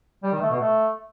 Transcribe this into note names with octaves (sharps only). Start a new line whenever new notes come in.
G3
D#3
A3
B2
A3